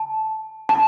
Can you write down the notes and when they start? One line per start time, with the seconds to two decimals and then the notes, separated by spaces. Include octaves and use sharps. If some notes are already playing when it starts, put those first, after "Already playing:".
Already playing: A5
0.69 A5